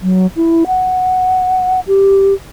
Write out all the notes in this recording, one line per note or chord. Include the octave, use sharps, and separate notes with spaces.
F#3
E4
F#5
G4